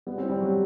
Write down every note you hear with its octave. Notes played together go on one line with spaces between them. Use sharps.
G3 B3
C4
E4
G3
F#3 G4